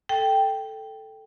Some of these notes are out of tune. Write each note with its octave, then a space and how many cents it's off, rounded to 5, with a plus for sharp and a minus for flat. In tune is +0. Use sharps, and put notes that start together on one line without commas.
A4 +0 G5 +0